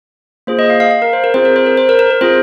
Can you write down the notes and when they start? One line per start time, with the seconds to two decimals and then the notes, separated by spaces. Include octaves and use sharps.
0.47 A#3 F4 G#4 C5
0.59 D#5
0.70 F5
0.80 F5
0.91 F5
1.02 A#4
1.13 C5
1.24 A#4
1.34 C4 F4 G#4 C5
1.45 A#4
1.56 C5
1.66 A#4
1.77 C5
1.89 A#4
1.99 A#4
2.10 A#4
2.21 C4 F4 G#4 C5